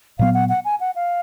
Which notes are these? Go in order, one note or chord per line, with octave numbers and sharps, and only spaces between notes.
A#2 F#3 B3 F5
F#5
F#5
G#5
F#5
F5